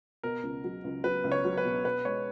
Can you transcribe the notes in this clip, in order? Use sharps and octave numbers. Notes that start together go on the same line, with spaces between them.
B2 A#4
C#2
F#3
C#2
F#3 B4
C#2
C#5
F#3
B4
B2
B2 B4
G#3 C#5